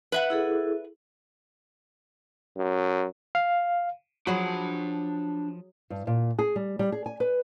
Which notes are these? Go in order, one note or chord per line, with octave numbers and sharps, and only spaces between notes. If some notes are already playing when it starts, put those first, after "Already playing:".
B4 E5 F#5
E4 G#4 A4
F#2
F5
F3 F#3 D4 G#4 B5
G2
A#2
G#4
G3
G3
G#4
G#5
B4